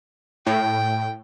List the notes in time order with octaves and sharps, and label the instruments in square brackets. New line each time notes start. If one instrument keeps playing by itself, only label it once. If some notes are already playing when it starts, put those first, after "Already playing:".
[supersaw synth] A2 [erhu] G5